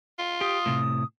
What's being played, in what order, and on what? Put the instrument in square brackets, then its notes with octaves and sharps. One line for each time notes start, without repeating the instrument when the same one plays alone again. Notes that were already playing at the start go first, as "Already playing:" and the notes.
[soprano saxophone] F4
[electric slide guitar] G4 [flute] D#6
[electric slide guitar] A2 C3